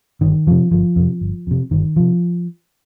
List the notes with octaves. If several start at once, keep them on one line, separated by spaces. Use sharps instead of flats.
G1 D#3
F2 C3 F3
G1 F3
F2 C3
G1
F2 C3
G1 D#3
C3 F3